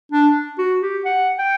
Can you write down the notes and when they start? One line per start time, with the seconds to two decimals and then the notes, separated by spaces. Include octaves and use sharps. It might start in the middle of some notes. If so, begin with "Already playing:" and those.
0.12 D4
0.58 F#4
0.81 G4
1.05 F#5
1.38 G5